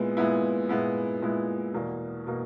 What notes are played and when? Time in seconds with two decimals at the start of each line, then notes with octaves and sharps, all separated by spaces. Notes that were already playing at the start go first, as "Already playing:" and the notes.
Already playing: A#2 G#3 B3 E4
0.17 A#2 G#3 B3 E4
0.69 A#2 G#3 B3 E4
1.22 A#2 G#3 B3 E4
1.74 E2 B2 A#3
2.27 B2 A#3